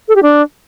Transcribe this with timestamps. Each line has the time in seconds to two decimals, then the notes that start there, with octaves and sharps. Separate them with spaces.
0.08 A4
0.16 G4
0.23 D4